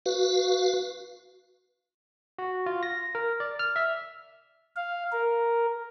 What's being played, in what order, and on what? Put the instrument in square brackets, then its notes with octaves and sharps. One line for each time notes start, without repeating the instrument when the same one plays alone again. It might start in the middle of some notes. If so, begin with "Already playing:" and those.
[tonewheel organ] F#4 B4 F5
[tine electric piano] F#4
F4
A#6
A#4
D5
F6
E5
[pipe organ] F5
A#4